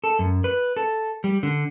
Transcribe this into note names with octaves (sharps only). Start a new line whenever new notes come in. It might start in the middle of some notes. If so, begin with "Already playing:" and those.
A4
F#2
B4
A4
G3
D3